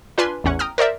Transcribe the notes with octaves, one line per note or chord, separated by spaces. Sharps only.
D4 F4 B4 G#5 C6
A1 E2 C#4 F#5 C#6
G5 A#5 D#6 F6
A#4 C5 D5 E5